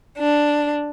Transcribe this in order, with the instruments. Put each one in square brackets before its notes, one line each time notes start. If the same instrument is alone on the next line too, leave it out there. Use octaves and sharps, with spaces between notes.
[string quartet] D4